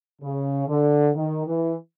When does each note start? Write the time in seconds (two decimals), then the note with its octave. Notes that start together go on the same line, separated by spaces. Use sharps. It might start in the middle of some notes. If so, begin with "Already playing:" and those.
0.22 C#3
0.68 D3
1.16 D#3
1.46 E3